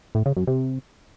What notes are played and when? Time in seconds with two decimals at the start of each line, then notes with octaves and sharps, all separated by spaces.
0.15 A2
0.26 C#3
0.36 F#2
0.47 C3